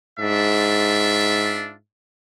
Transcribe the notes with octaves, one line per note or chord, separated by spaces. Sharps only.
G#2 D4 F4 E5